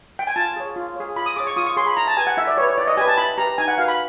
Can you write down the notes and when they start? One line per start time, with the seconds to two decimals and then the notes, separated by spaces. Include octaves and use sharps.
0.19 G5
0.27 G#5
0.36 F4 A5
0.56 G#4 C#5
0.76 F4
0.96 G#4 C#5
1.16 F4 B5
1.26 D#6
1.36 G#4 C#5 D6
1.47 C#6
1.56 F4 D#6
1.67 C#6
1.76 G#4 C#5 C6
1.87 B5
1.97 E4 A#5
2.07 A5
2.17 G4 B4 G#5
2.27 F#5
2.37 E4 E5
2.47 D5
2.57 G4 C#5
2.60 B4
2.67 C#5
2.77 E4 D5
2.87 D#5
2.97 G4 B4 G#5
3.08 A5
3.18 E4 B5
3.38 G4 B4 A#5
3.58 D#4 G#5
3.68 F#5
3.78 F#4 B4 F5
3.88 B5